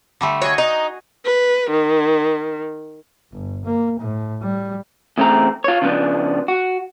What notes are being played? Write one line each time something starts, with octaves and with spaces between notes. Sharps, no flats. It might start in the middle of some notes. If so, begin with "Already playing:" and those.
D3 G3 A3
F#4 G#4 C#5 D#5
D#4
B4
D#3
G1
A#3
A2
G3
E2 C#3 A3 C4 A#5
F4 C#5
C#3 F3 B3 D4
F#4